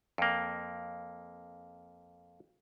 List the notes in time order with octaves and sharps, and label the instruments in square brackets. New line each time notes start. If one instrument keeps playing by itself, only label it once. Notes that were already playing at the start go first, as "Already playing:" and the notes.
[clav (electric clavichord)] F2 A#3